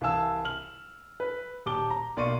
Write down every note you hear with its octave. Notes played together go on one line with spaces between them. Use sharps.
C2 E3 F5 G#5 A5 E6
F6 F#7
B4
D#1 G4 A5 D6 G7
A#5
B1 A#3 D5 C6 C#6 D#7